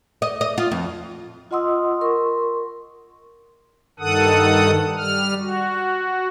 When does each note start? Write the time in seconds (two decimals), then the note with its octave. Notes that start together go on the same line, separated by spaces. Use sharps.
0.22 D#5
0.41 D#5
0.58 F4
0.72 F2
1.51 F4 D#5 F#5 C6 D#6 E6
2.01 A#4 C6 C#6
4.00 G2 D#3 A4 F#5 D#6
4.98 G3 F6
5.39 F#4